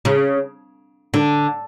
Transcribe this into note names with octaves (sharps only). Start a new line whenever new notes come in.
C#3
D3